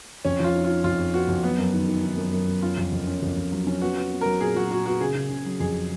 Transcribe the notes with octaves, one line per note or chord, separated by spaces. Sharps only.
F2 C#4
F3 F4
D#4
F4
D#4
F2 F4
F2
B3 F#4
F2
F#3 B3
F#2
D#3
D#3
D#3
F#2
F#2
F#2
C#4 F4
F2
F2
C#4
F2
F2
F#3
C#4
B3 F#4
B3
B3
F#3 A#4
A#2 G#4
F#3 F#4
A#2 F#4
B3 F#4
C#3 G#4
C#3
C#3
F#3
F2 G#4